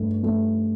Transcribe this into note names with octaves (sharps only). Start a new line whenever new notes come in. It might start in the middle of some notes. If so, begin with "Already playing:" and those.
Already playing: G2 A3
A3